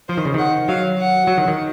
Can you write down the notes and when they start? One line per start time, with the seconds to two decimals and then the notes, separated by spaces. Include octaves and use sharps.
0.09 F3 C5
0.17 D#3
0.25 C#3
0.34 D#3 F#5
0.68 F#3 F5
0.99 F#5
1.27 F#3
1.38 D#3
1.48 D#3